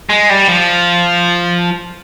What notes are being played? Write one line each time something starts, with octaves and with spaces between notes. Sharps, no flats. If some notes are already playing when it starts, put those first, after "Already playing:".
G#3
G3
F3